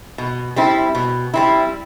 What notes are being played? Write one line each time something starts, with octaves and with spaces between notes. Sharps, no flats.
B2
G3 C4 E4
B2
G3 C4 E4